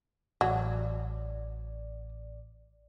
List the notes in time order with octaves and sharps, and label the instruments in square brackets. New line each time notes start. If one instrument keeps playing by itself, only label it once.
[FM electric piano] A1 D5 [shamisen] F#3